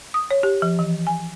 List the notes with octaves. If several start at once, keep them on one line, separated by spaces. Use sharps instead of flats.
D#6
C#5
G4
F3
E3
G#5